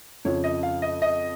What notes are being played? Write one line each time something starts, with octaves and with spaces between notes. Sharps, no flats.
F2 C#3 F3 C#5
D#5
F5
D#5
D#5